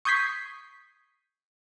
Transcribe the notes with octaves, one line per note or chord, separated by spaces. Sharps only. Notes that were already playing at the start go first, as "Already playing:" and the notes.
C#6 D#6 G6 G#6 B6 C7